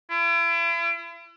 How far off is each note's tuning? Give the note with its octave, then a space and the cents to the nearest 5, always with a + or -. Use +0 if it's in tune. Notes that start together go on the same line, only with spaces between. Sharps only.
E4 +40